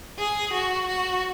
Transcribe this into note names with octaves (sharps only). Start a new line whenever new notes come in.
G#4
F#4
F#4